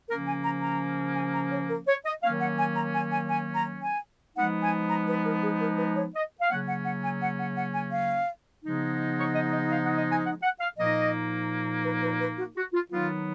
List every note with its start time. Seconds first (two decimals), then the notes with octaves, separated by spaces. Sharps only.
0.09 C#3 F3 A#3 C#4 A#4
0.27 G#5
0.45 A#5
0.63 A#5
1.16 G#5
1.34 A#5
1.52 C#5
1.70 A#4
1.88 C#5
2.05 D#5
2.23 D#3 F#3 A#3 C#4 F5
2.41 F#5
2.59 G#5
2.77 A#5
2.95 G#5
3.13 G#5
3.29 G#5
3.56 A#5
3.84 G#5
4.37 F3 G#3 B3 D#4 F#5
4.64 G#5
4.91 A#5
5.08 B4
5.26 A#4
5.43 G#4
5.61 A#4
5.80 B4
5.97 C#5
6.15 D#5
6.41 F5
6.51 C#3 F#3 A#3 C#4 F#5
6.69 F#5
6.86 F#5
7.04 G#5
7.22 F#5
7.39 F#5
7.57 F#5
7.75 G#5
7.93 F5
8.64 C#3 F3 G#3 B3 D#4
9.18 C#5
9.35 D#5
9.53 D#5
9.71 F5
9.85 F#5
9.98 D#5
10.12 G#5
10.24 F#5
10.42 F#5
10.61 F5
10.78 A#2 F3 A#3 D#4 D#5
11.85 B4
12.03 B4
12.21 B4
12.38 F#4
12.56 F#4
12.74 F4
12.91 D#3 F#3 B3 D#4 F4